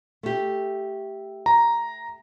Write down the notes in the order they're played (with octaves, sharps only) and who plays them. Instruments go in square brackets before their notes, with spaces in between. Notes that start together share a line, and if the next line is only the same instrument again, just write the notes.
[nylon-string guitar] A3 G4
[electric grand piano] A#5